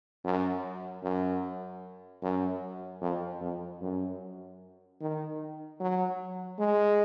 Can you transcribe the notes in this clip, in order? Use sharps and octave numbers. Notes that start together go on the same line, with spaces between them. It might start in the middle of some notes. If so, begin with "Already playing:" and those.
F#2
F#2
F#2
F2
F2
F#2
D#3
F#3
G#3